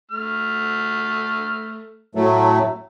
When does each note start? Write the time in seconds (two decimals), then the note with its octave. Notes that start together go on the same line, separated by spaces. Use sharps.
0.11 A3 F6
2.15 A2 F#3 A3